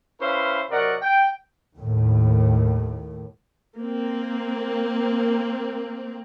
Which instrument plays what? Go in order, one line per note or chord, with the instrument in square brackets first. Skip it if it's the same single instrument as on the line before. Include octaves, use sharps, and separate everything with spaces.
[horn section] C#4 E4 B4 C5 E5 F5
C3 F#3 A#4 D5 D#5 F#5
G5
[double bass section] D#2 A2
[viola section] A#3 C4